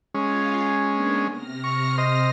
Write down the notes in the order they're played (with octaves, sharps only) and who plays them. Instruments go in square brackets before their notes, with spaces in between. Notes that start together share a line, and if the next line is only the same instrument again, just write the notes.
[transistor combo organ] G#3 C#4 [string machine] F4 F5
[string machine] A#3 B3 D4
C3 F6 A#6
[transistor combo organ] C#6
C5 D#5